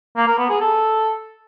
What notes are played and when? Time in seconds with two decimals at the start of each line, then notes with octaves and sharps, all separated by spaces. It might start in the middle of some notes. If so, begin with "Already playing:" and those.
0.17 A#3
0.28 A#4
0.39 B3
0.50 G#4
0.61 A4